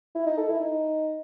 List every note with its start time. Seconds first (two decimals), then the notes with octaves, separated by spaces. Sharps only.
0.15 E4
0.26 D#4
0.38 A4
0.49 E4
0.60 D#4